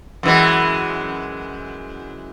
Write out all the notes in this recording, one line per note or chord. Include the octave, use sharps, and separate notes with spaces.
F#2 E3 G#3